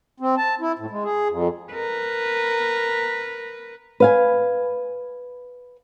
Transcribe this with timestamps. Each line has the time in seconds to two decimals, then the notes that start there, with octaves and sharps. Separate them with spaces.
0.20 C4
0.37 A5
0.61 E4
0.79 A2
0.90 G#3
1.04 G#4
1.29 F2
1.72 A#4 B4
4.00 B4 F5 G#5